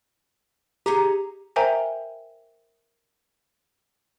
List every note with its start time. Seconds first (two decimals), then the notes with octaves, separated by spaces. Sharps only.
0.86 D#4 G4 G#4 A#5
1.56 A#4 C5 E5 G5 G#5 A#5